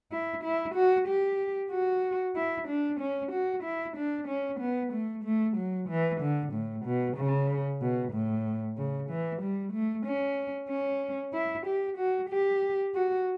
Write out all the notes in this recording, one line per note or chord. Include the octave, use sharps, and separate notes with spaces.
E4
E4
F#4
G4
F#4
E4
D4
C#4
F#4
E4
D4
C#4
B3
A3
A3
F#3
E3
D3
A2
B2
C#3
B2
A2
C#3
E3
G3
A3
C#4
C#4
E4
G4
F#4
G4
F#4